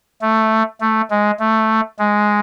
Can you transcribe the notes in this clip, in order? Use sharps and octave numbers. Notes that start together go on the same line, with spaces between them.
A3
A3
G#3
A3
G#3